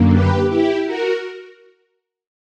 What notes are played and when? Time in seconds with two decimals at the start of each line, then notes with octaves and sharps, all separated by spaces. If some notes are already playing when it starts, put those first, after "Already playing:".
Already playing: F#2 D3 A#3
0.12 G4 B4
0.49 E4 G4
0.85 F#4 A#4